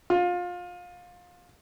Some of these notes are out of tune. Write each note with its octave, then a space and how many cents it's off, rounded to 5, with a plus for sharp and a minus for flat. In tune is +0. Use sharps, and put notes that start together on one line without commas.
F4 +25